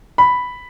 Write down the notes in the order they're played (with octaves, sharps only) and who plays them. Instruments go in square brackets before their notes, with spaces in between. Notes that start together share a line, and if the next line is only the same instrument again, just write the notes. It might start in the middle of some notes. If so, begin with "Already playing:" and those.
[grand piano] B5